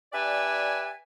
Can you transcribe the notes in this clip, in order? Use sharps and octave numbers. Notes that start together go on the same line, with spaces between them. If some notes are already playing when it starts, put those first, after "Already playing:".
D4 G4 B4 D5 E5 G#5